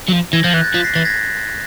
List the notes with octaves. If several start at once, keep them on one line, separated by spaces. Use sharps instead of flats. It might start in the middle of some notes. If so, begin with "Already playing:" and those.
F#3
F3
E3 G#6 A#6
F3 G6 A6
E3 F#6 G#6
G6 A6
F3 A6 B6
A#6 C7
E3 A6 B6
G#6 A#6